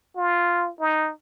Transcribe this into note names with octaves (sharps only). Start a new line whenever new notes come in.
F4
D#4